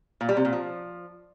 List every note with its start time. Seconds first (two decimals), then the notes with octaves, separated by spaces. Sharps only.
0.21 A#2
0.29 G3
0.37 C3
0.45 A#2
0.53 F3